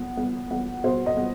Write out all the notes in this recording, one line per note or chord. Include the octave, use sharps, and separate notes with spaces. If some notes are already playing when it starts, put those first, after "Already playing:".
Already playing: B3
B3
B3
B2 C5
D#5
B3